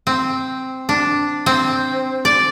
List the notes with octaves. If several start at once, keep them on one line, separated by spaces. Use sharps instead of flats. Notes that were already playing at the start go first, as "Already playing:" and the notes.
C4
D4
C4
D5